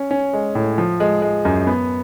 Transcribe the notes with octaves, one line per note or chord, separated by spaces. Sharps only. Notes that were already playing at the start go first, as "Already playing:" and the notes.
Already playing: C#4
C#4
G#3
A2
F3
G#3
G#3
F#2
B3